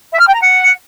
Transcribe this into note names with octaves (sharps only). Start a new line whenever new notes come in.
E5
F6
G5
A#5
F#5